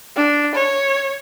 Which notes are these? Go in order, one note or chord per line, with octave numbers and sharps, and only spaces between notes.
D4
C#5